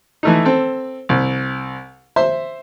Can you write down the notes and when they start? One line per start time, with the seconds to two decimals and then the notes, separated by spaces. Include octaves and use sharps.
0.23 E3 A3 D#4
0.45 C4 A4
1.09 C2
2.16 C5 E5 C6